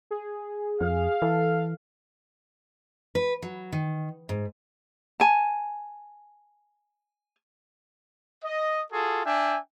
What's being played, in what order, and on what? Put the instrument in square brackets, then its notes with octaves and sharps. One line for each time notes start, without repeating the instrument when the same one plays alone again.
[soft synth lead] G#4
[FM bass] F2 [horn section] F5
[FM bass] E3 [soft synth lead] A4
[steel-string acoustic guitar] B4
F#3
D#3
G#2
[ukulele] G#5 A5
[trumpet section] D#5
F4 F#4 G#4 A4
D4 E5 G5 G#5